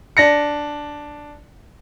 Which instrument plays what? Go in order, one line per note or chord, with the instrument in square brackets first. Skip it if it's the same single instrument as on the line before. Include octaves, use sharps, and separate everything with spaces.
[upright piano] D4 A#6 C#7